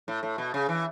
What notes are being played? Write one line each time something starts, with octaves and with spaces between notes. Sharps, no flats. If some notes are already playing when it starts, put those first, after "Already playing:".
A2
A2
B2
C#3
E3